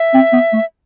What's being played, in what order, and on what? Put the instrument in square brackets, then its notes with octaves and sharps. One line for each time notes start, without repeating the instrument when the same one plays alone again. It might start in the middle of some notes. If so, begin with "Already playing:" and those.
Already playing: [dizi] E5
[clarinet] C4
B3
A3